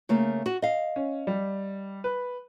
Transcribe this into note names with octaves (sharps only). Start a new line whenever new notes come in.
C#3 A3 A#3
F#4
D#5 F5
C#4
G3
B4